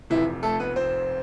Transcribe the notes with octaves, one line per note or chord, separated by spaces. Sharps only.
F1 F2 C3 E3 E4
A3 A4
B3 B4
C4 C5